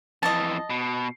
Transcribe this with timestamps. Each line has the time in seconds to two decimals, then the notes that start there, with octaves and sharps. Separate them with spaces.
0.23 F2 E3 D#5 A5
0.70 B2